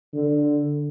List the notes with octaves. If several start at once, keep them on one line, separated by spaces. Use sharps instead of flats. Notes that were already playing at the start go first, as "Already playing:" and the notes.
D3